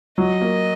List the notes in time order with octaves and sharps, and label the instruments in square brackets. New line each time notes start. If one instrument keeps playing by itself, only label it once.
[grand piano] F#3 [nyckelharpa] D#5
[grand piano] A#3